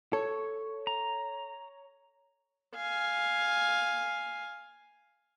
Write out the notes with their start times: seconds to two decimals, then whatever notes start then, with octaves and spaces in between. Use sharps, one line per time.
0.13 A4 C#5
0.87 A#5
2.76 F5 G#5